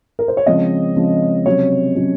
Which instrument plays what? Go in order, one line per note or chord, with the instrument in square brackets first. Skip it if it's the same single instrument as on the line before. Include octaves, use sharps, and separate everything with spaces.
[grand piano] A#4
C5
C#5
C#3 F3 G#3 C4 D#5
C#3 F3 G#3 C4
C3 F#3 C#4 C#5
C3 F#3 C#4